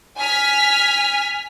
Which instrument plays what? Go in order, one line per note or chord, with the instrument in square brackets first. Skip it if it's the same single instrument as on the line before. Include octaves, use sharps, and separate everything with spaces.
[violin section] G#5 F6 B6